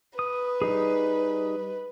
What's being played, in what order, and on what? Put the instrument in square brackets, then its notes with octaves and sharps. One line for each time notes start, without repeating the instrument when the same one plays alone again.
[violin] B4 [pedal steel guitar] D#6
[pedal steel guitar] G3 D#4 G#4